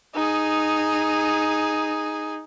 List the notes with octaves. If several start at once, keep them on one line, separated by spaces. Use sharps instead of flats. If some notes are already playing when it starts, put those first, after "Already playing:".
D#4 G#4